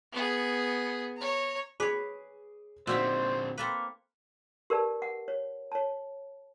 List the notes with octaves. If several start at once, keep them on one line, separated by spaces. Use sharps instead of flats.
B3 G#4
C#5 A#5
G#4 B4 C#5 D6
A#2 D3 C4 D#4 F#4 C5 E5 E6
A#3 C4 A4 B4
G4 A#4 B4 D5 A5
F#5
C#5
C#5 A5